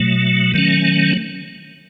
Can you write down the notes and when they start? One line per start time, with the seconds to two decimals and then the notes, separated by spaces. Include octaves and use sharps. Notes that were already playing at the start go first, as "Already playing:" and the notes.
Already playing: B2 F#3 A3
0.54 D#3 F#3 A3 C#4